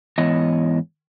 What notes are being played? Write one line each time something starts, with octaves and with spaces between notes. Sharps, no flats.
G#2 E3 B3 E4 C#5 D#5